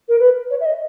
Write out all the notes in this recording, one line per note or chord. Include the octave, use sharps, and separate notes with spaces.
A#4
B4
C#5
E5
D#5